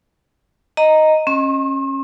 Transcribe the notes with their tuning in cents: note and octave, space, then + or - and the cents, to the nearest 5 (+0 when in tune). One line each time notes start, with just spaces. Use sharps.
D#5 +0 A#5 -5
C#4 -25 C6 +45